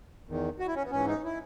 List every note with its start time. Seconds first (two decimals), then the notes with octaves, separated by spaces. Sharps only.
0.27 E2 D#3
0.59 F#4
0.67 E4
0.76 C#4
0.84 B3
0.91 G#2 E3 C#4
1.07 D#4
1.24 E4